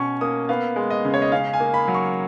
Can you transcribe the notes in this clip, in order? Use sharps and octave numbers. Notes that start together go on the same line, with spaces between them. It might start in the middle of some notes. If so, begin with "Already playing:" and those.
Already playing: B2 C#4 C#6
A#3 D#6
B3 F5
G#3
D#5
C#3
C#5
D#5
C#4 F5
G#5
A#3
B5
F#3
C#6